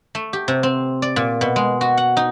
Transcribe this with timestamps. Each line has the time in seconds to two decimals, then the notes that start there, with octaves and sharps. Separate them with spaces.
0.15 A3
0.33 G4
0.48 C3
0.63 C4
1.02 D5
1.16 A#2
1.41 B2
1.56 G#3
1.81 F#4
1.97 F#5
2.17 D#4